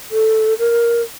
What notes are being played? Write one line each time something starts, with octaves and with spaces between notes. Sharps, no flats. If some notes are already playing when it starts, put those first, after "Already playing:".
A4
A#4